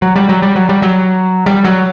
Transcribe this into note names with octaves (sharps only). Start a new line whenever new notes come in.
F#3
G3
F#3
G3
F#3
G3
F#3
G3
F#3